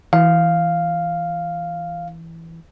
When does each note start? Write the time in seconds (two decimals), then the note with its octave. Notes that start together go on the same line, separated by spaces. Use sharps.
0.13 E3 F5